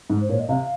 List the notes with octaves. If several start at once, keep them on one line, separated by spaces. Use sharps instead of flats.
G#2
C5
A#2 C#5
D#5
C3 F5